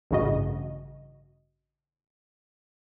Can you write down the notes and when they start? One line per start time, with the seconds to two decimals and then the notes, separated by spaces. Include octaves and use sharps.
0.11 A1 G2 C#3 F#4 D#5